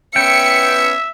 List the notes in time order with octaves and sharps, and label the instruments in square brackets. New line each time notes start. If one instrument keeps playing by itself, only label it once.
[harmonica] B3 C#4 B4 [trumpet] E5 [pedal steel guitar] G5 [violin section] C#7